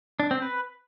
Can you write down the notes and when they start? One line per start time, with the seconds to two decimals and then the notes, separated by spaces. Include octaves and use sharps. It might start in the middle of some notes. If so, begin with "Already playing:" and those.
0.20 D4
0.31 C4
0.42 B4